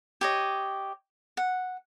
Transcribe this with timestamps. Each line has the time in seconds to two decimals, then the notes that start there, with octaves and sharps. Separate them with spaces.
0.21 G4 C#5 D#5
1.37 F#5